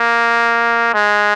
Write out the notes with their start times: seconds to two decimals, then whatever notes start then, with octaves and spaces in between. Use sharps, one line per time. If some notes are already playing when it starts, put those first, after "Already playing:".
Already playing: A#3
0.94 G#3